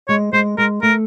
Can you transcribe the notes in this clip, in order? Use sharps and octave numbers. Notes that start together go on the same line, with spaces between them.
G#3 C#5
G#3 C5
G#3 A#4
A3 A#4